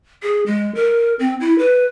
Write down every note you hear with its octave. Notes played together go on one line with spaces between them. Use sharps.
G#4
G#3
A#4
C4
E4
B4